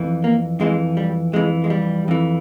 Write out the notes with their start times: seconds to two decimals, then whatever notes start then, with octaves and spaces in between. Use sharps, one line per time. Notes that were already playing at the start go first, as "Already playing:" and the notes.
Already playing: F2 E3
0.24 A#3
0.60 F2 E3 G#3
0.97 G3
1.33 F2 E3 G#3
1.64 G#3
1.70 G3
2.08 F2 E3